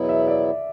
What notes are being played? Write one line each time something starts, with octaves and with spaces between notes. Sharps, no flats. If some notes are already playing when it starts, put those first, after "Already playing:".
Already playing: E2 B2 F#3 B3 E4
E5
D5